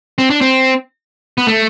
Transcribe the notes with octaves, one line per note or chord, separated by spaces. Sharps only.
C4
D4
C4
B3
A3